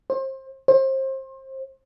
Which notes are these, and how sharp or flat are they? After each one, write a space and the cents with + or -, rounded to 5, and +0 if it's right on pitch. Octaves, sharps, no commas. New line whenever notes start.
C5 +30
C5 +30